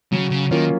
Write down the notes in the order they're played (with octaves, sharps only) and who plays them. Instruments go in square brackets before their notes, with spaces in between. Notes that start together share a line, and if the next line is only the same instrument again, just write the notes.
[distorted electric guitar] C#3 [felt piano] F#3
[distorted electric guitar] C#3
[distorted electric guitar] D#3 [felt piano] A#3 C#4 F4